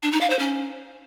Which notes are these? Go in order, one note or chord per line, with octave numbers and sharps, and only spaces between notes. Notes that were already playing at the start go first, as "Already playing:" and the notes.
D4
D#4
F5
C5
C#4